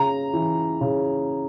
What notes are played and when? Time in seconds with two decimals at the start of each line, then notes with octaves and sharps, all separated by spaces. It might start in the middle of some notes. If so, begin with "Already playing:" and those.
Already playing: C#3 A#5
0.33 E3
0.81 C#3